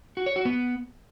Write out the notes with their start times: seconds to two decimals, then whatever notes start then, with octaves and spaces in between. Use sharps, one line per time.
0.17 F#4
0.26 C#5
0.36 F#4
0.45 B3